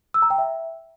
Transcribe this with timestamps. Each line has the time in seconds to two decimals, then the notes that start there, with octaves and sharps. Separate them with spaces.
0.14 E6
0.22 A#5
0.30 G5
0.38 E5